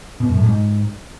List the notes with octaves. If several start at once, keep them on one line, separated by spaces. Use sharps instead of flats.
B2
F#2
A2
G#2